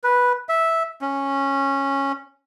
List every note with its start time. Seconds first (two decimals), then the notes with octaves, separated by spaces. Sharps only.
0.04 B4
0.49 E5
1.02 C#4